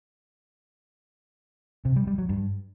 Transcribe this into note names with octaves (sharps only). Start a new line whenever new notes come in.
C3
G3
G3
F#3
G2